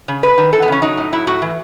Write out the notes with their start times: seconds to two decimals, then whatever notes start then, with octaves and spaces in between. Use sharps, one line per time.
0.08 C#3
0.23 G#3 B4
0.38 D#3
0.53 E3 A4
0.62 B3
0.68 C#3 C#4
0.82 F#3 D#4
0.97 A2
1.12 F#3 E4
1.27 A2 F#4
1.42 E3